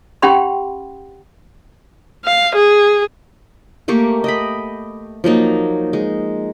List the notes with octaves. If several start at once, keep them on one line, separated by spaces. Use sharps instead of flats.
C#4 G4 F#5 G5 B5 C6
F5
G#4
A3 A#3 G4 C#6
D#5 G5 B5
F3 F#3 A#3 D#4
G#3